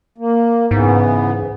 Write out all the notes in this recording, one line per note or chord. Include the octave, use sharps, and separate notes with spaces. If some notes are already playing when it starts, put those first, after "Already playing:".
A#3
G#2 C#3 E3 B3